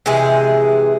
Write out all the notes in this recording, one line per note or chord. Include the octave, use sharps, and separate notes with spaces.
C3 E3 G#3 G#4